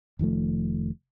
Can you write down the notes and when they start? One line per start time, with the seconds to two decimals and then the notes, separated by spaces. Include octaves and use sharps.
0.19 F1 D#3 F3 A3